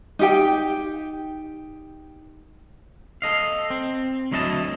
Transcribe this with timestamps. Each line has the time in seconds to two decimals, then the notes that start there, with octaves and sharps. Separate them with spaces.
0.19 D#4 G4 G5
3.22 A4 D#5 F5
3.70 C4
4.32 D2 F#3 E4 D#5 F5 A5